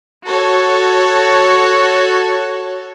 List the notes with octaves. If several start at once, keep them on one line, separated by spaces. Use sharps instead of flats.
F#4 A4 C#5